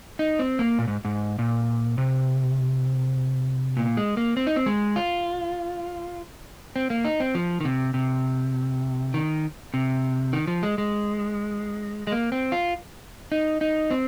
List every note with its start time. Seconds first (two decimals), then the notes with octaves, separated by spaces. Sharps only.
0.19 D#4
0.39 C4
0.59 A#3
0.79 A#2
0.88 G#2
1.05 G#2
1.39 A#2
1.98 C3
3.77 A#2
3.97 G#3
4.17 A#3
4.37 C4
4.47 D#4
4.56 C4
4.66 G#3
4.96 F4
6.76 C4
6.90 A#3
7.05 D#4
7.20 C4
7.35 F3
7.61 D#3
7.65 C3
7.94 C3
9.14 D#3
9.74 C3
10.33 D#3
10.47 F3
10.63 G#3
10.78 G#3
12.07 G#3
12.12 A#3
12.32 C4
12.52 F4
13.32 D#4
13.61 D#4
13.91 C4